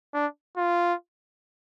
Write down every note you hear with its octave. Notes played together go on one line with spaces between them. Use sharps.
D4
F4